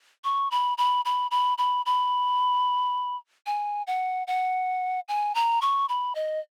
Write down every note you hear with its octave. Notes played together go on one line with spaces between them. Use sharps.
C#6
B5
B5
B5
B5
B5
B5
G#5
F#5
F#5
G#5
A#5
C#6
B5
D#5